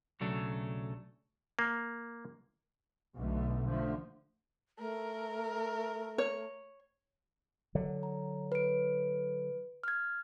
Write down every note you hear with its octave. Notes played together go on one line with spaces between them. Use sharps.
B1 C#3 F#3 A3 D4
A#3
B1 B2 D3 A3
D3 F3 A3
A3 A#4
C#5
D3 F#3
A#5
B4 D7
F6 G#6